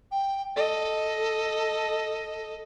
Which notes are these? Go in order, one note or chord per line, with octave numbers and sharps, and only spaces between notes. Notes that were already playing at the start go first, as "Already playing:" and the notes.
G5
A4 D#5